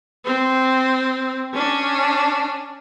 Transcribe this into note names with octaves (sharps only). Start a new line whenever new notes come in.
C4
C#4 D4